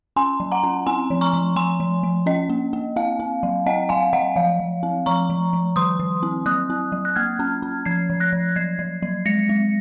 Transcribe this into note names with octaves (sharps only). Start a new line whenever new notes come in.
C#4 G#5 C6
F#3
F#5 A#5
C#4
C4 G#5 C6
F3
A#5 C#6
F3
F3 G#5 C6
F3
F3
C#4 D#5
A#3
A#3
C4 F5
C4
F#3
C4 D#5 F#5
F#3 F5 G#5
F#3 D#5 F#5
F3 F5
F3
C4
F3 A#5 C#6
F3
F3
D#3 C6 D#6
D#3
C4
F#3 D#6 F#6
C4
F#3
F#6
A#3 F6 G#6
C#4
C#4
F3 G#6 C7
F3
F#6 A#6
F3
F#3 G#6 C7
F#3
F#3
G#3 A#6 C#7
G#3